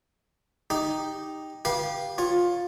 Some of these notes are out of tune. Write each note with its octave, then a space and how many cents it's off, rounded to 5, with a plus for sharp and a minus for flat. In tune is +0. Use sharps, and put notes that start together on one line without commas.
D#4 +0 G4 +0
G4 +0 B4 -30 F5 +0
F4 +15 C#5 -10